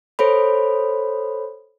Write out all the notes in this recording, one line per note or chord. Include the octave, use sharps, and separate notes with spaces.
A4 C5 C#5 B5